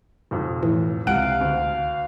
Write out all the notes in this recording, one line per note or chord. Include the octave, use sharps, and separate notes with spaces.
B1 F2
A2 E3
C#2 C3 F5 F#5 F#6 D7
D2